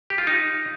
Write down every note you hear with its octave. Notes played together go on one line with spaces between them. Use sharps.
G4
F4
D#4